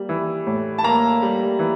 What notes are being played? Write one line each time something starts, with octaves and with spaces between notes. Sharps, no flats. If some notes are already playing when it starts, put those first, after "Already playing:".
Already playing: G3 A#3
E3
A2
A5
A#3 A#5
G3
E3